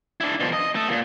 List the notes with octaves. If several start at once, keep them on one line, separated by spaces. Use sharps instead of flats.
D4 E4
B2 F3
D#5
A3 A4
D#2 A#2